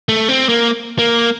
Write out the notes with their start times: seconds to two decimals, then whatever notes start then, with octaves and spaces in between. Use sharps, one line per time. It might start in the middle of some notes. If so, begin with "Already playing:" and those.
0.09 A3
0.29 C4
0.49 A#3
0.99 A#3